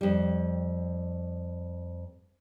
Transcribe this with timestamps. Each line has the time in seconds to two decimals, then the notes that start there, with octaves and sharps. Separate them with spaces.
0.01 F2 G3